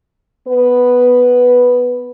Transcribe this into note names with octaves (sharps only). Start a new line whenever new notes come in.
B3 B4